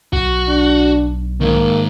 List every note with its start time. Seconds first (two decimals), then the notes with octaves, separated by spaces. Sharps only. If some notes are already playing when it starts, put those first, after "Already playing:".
0.13 B1 F#4
0.48 D4
1.41 G#2 D#3 A#3